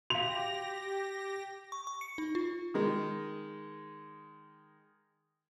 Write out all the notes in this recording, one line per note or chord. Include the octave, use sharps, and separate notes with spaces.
F#4 G4 F5 A#6 F7
C#6
C#6
C#7
D#4
F4
D#3 G#3